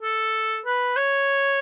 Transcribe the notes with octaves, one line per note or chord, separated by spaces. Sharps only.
A4
B4
C#5